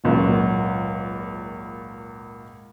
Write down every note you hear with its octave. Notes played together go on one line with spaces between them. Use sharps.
G#1 C#2 A#2 F#3 F#4